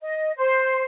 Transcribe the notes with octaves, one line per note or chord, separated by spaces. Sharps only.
D#5
C5